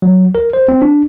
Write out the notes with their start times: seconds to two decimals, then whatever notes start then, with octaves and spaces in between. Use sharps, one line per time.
0.02 F#3
0.35 A#4
0.53 C5
0.68 C4
0.82 D4